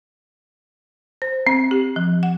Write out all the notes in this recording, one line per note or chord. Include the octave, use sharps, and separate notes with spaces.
C5
C4
G4
F3
F#5